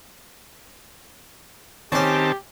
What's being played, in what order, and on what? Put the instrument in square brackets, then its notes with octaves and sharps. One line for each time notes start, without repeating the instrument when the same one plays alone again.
[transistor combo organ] D#3 C4 A5 [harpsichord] C#4 C#5 [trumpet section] G4